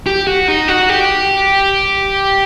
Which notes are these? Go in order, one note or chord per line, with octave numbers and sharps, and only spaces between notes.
G4
F#4
D#4
F#4
G4